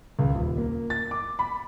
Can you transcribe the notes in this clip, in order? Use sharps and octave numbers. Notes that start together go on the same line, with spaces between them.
C#2
D#1
A#3
A6
D6
B5